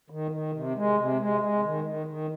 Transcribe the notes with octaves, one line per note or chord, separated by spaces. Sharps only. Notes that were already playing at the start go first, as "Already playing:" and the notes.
D#3
D#3
C3
G#3
C3
G#3
G#3
D#3
D#3
D#3